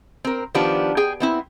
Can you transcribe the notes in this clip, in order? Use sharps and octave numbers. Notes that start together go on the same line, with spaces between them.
C4 A#4
D#3 F3 B3 D4 G4
G#4 G5
B3 C4 E4